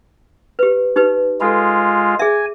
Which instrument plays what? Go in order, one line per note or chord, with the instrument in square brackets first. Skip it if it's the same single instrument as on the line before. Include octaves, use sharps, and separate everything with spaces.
[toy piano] G4 B4
D#4 G4 B4
[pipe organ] G#3 F4 [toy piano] A4 B5
[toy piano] G#4 E5 [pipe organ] G#5